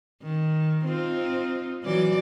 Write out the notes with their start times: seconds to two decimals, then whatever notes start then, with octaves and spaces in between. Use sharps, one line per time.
0.23 D#3
0.85 C4 D#4 F4
1.83 E3 F#3 D5